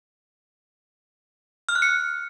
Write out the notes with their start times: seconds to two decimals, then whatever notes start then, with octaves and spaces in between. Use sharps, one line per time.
1.69 F6
1.75 F#6
1.82 C#7